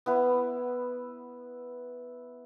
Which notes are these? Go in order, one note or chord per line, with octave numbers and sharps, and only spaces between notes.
B3 E4 B4